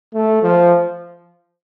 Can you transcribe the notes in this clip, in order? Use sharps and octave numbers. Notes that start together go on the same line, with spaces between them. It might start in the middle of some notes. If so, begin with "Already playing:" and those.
A3
F3